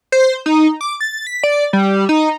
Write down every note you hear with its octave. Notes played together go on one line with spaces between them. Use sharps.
C5
D#4
D6
A6
B6
D5
G3
D#4